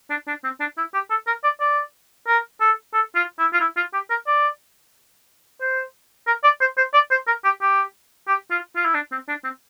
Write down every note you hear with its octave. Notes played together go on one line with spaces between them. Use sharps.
D4
D4
C4
D4
E4
G4
A4
A#4
D5
D5
A#4
A4
A4
F4
E4
F4
E4
F4
G4
A#4
D5
C5
A#4
D5
C5
C5
D5
C5
A#4
G4
G4
G4
F4
F4
E4
D4
C4
D4
C4